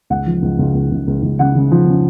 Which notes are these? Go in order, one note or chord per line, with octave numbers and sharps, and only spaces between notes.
C#2 F#5
F3
C#2
C#2
C#2
C#2
C#2
C#2
C#3 F#5
C#3
F3
C#3